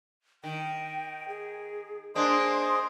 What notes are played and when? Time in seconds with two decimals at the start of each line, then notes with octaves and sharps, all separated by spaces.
0.44 D#3 G5
1.28 G#4
2.15 A#3 D4 G#4 C5 D#5 C6